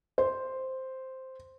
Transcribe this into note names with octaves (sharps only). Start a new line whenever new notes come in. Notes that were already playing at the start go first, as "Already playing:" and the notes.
C5